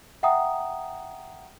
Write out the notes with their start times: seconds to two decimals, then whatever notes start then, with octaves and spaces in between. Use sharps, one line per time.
0.23 E5 F#5 G5 A#5 D#6